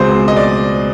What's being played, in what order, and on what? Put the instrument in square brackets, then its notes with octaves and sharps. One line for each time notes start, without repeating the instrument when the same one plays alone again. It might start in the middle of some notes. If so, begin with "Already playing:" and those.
Already playing: [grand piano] C#2 B2 G#3 C4 C5
D#5
D5